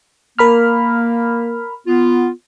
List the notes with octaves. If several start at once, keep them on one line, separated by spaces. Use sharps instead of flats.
A#3 A#4 B5 F6
B3 F4